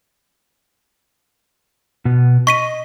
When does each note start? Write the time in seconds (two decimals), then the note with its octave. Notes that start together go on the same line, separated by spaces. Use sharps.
2.05 B2 B3
2.47 D#5 C#6 B6 D#7